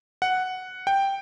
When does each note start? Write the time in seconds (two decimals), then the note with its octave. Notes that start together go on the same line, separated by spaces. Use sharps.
0.22 F#5
0.87 G5